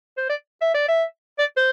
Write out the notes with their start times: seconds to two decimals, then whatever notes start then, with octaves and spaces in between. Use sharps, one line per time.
0.18 C5
0.29 D5
0.62 E5
0.74 D5
0.88 E5
1.39 D5
1.57 C5